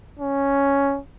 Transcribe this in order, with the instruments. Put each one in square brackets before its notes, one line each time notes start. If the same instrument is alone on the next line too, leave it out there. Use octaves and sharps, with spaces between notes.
[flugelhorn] C#4